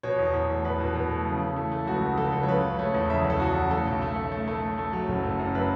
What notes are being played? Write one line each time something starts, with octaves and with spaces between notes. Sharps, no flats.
B2 C#5
E2
E2
A3
E2 B4
B2
B2
A3
C#3
E3
A3
A3
C#2 F#4
C#2
C#2 A4
C#2
C#5
C#3 B4
C#3
A3 C#5
E2
C#3 E5
E2
A4
E2 F#4
C#3
A3 A4
B1
A3
A3
A3
A3
A3
A3
F#3
F#1
A3
F#2
A3 B4